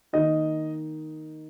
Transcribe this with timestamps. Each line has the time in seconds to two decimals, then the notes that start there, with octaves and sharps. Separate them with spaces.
0.13 D#3 A#3 D#4 D#5